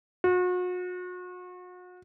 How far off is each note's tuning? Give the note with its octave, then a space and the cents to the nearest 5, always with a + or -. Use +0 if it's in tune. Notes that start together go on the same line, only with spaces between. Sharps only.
F#4 -40